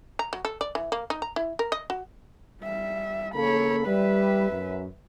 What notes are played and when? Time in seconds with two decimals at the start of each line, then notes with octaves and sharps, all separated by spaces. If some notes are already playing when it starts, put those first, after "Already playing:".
0.19 A#5
0.33 F#3
0.45 A4
0.61 D5
0.75 E3
0.92 A#3
1.10 D#4
1.22 A#5
1.36 E4
1.59 A#4
1.72 D#5
1.90 F#4
2.62 G3 E5
3.35 C#3 A#3 A4 C#5 B5
3.86 G3 B4 E5
4.50 F#2